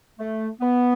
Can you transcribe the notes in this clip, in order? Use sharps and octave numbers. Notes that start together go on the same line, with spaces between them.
A3
B3